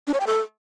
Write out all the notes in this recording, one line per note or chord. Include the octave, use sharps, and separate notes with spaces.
D4
C#5
G5
A4